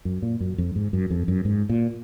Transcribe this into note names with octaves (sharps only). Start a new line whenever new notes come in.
F#2
A#2
F#2
F2
G#2
F#2
F2
F#2
G#2
A#2